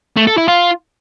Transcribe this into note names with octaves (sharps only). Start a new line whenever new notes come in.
A3
A4
E4
F4